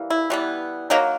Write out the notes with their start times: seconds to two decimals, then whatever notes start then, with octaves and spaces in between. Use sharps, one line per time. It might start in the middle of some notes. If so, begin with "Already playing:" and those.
Already playing: E3 G3 A#3
0.10 E4
0.30 E3 G3 B3
0.90 D#3 F#3 A#3 D#4